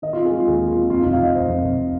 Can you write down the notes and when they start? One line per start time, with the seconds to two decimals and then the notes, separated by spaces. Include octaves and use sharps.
0.02 D#3 D#5
0.13 C4 F4
0.25 G#4
0.32 G#3 F4
0.47 D#2 G#4
0.61 D#3
0.68 F4
0.76 C4
0.90 F2 F4
1.01 F1 D#4
1.13 F5
1.20 F3 D#5
1.35 F1 C5
1.49 F2
1.64 F1